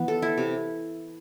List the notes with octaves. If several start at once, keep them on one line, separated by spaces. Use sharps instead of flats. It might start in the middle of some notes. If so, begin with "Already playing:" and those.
Already playing: E3 B3
A4
E4
C3